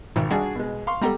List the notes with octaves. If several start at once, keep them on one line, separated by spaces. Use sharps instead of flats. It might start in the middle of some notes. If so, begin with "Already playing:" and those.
G#1 G#2 B2 D#3
G3 D4 F#4 G#4
B2 G#3
F5 C6 C#6
G3 G#3 B3 A4 A#5